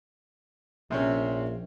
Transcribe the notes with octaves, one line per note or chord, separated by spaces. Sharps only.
A#1 C3 C4 C#4